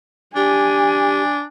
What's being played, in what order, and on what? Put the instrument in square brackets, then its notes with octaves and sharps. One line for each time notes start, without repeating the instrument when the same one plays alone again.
[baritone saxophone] D4 [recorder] G4 [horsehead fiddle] G#5